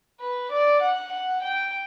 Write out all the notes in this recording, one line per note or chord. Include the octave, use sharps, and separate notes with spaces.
B4
D5
F#5
F#5
G5